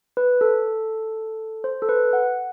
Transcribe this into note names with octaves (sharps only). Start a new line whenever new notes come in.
B4
A4
C5
A4
B4
F#5